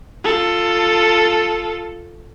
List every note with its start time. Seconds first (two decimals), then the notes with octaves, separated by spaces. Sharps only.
0.24 F4 A4